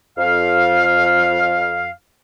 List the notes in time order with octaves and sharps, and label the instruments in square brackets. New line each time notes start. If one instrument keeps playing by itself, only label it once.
[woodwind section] F2 F5